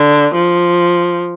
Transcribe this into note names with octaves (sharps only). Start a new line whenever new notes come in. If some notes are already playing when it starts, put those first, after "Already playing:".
Already playing: D3
F3